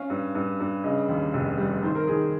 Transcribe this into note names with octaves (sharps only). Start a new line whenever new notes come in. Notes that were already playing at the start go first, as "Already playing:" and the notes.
Already playing: C#4 F5
G2
G2
G2
C#3 D#5
D#2
F1
G3
D#3 C5
A#4
D#3 G#4